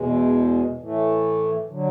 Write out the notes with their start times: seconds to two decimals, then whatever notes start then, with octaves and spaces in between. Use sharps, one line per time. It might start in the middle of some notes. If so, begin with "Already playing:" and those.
Already playing: E2 B2 G#3
0.79 A2 E3 A3
1.69 D3 F#3